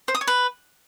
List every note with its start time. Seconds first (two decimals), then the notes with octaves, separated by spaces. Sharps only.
0.08 C5
0.15 D#6
0.21 C#5
0.27 B4